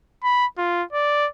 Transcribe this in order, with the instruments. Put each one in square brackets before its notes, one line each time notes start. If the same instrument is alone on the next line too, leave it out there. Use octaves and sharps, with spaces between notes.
[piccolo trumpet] B5
F4
D5